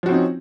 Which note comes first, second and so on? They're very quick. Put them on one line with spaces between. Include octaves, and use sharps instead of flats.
F3 F#4 C4 D#4 C#4